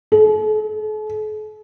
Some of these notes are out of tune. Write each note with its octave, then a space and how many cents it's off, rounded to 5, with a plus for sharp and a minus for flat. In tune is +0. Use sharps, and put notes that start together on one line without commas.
A4 -45